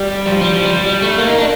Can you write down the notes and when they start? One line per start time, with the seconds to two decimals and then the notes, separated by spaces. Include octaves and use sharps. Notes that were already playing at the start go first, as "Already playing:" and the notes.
Already playing: G3
0.26 F3
0.41 G3
0.53 F3
0.65 G3
0.87 G3
1.02 A3
1.18 A#3
1.28 D#4
1.38 D4